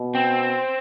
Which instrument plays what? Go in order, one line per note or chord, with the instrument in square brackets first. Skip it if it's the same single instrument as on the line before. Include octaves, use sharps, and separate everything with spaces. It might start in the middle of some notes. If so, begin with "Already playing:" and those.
Already playing: [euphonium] B2
[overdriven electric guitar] C4